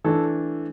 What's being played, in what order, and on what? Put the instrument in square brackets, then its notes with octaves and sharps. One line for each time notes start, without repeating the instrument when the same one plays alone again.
[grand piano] E3 A3 D4 A4